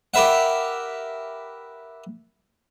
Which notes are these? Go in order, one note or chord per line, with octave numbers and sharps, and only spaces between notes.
G4 A#4 B4 E5 F#5